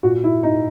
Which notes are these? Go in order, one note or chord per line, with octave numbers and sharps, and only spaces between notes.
A#2 F#4
E4
D#4